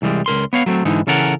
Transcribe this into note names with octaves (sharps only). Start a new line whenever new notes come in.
C2 E3 G3 G#3
C#2 A#4 C6
B3 C#5 F5
F#3 A3 C4
G#2 D3 E3 D#4
C#3 E3 C#4 A4 A#4 F#5